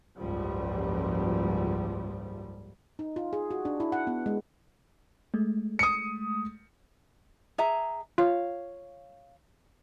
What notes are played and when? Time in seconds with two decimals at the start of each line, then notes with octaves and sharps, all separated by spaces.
0.17 F#1 C#2 G#2 F3 G3
2.99 D#4
3.16 F4
3.33 G#4
3.51 F#4
3.65 D4
3.80 E4
3.92 F#5
4.07 B3
4.26 G#3
5.34 G#3 A3
5.79 D#6 C#7
7.58 G#4 E5 A#5
8.18 F4 C#5 F5